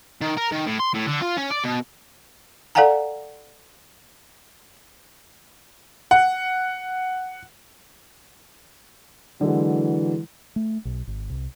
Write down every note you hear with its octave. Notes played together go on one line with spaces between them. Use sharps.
D#3
A#4
D#3
A2
C6
A2
D3
F4
C#4
D5
B2
A4 D5 F5 F#5 G#5 A#5
F#5
D3 E3 F#3 G#3
A3
B1
G#1
C2